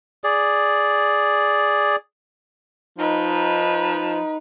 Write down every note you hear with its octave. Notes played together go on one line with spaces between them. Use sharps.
G#4 D5
F3 D#4 B4